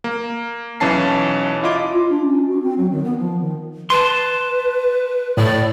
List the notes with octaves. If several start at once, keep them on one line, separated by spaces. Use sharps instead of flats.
A#3
B1 E3 C#4 A5 C7
E4 F4 D#5 D6
F4
D4
C#4
F#4
C4
F#3
D#3
B3
F3
D#3
B4 A5 C6
A2 D5